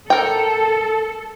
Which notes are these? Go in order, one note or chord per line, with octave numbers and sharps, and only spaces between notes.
A4 A#4 G5